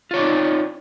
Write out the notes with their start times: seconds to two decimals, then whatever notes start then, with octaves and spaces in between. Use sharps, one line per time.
0.11 F4
0.14 C#5
0.16 D5
0.19 D#4
0.22 C4